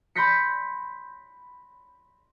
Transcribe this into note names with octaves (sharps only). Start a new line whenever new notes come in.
B5 C6 G6 A#6 B6 C#7